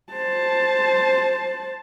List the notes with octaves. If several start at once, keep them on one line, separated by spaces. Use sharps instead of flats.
C5 A5